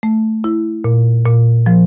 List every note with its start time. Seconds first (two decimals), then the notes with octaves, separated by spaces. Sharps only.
0.03 A3
0.44 E4
0.84 A#2
1.25 A#2
1.66 F3